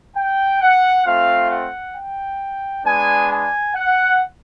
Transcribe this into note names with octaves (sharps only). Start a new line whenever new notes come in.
G5
F#5
A3 C4 F4 F5
F#5
G5
G#3 B3 D4 G#5
G#5
F#5